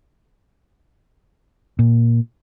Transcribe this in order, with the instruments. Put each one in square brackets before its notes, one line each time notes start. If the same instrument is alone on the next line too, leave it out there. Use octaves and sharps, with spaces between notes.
[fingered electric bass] A#2